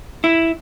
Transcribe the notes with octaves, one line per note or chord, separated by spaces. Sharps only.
E4